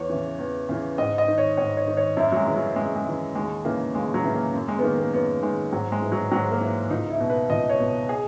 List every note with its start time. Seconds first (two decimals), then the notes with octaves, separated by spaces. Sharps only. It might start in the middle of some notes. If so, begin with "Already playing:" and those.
Already playing: E2 C#5
0.09 C#3 E3
0.39 E2
0.69 C#3 E3
0.98 G#2 D#5
1.18 D#5
1.28 D#3
1.38 C#5
1.57 G#2 C#5
1.77 C#5
1.87 D#3
1.97 C#5
2.17 F#2 E4
2.32 F#3
2.36 G#3
2.46 C#3 E3
2.56 F#3
2.76 F#2 G#3
2.95 G#3
3.06 C#3 E3
3.35 D#2 G#3
3.65 C#3 E3 A#3
3.94 D#2 G#3
4.14 F#3
4.24 C#3 E3
4.34 A#3
4.54 F#2
4.68 G#3
4.78 B3
4.83 D#3 A#3
4.98 A#3
5.13 F#2 B3
5.42 D#3 G#3
5.72 G#2 F#3
5.92 G#3
6.02 E3
6.12 F#3
6.31 G#2 F#3
6.51 A#3
6.61 E3
6.90 C#2 D#4
7.10 E4
7.20 B2
7.30 B4
7.50 C#2 D#5
7.69 C#5
7.80 B2
8.09 G#4